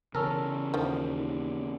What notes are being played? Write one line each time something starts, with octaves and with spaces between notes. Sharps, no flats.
C#3 E3 C#4 A4 A#4
D#2 D#3 F3